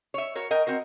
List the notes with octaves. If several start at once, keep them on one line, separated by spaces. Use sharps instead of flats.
C#5 E5
F#4 A#4 C#5
A#4 D#5 G5
C4 F#4 A#4